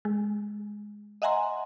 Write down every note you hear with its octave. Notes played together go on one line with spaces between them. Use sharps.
G#3
D#5 E5 F#5 G#5 A#5 C6